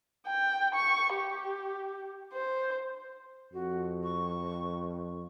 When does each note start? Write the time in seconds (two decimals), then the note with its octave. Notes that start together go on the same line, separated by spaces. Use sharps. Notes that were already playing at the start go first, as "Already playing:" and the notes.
0.27 G5
0.75 C#6
1.14 G4
2.34 C5
3.53 F2 F#4
4.03 C#6